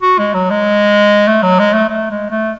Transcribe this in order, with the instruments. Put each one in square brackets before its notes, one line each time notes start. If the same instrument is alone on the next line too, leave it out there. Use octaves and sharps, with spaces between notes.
[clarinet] F#4
G#3
F#3
G#3
A3
F#3
G#3
A3
A3
G#3
A3